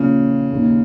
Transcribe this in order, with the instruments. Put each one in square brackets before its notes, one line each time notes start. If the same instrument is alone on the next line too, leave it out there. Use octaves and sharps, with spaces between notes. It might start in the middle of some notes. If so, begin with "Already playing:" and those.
Already playing: [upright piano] A#1 A#2 F3 A#3 [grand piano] C#3
[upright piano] D#2 D#3 A#3